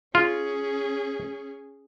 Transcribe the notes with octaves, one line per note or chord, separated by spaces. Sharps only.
C#4 F4 G#4